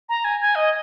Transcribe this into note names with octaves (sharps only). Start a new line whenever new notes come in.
A#5
G#5
G#5
D#5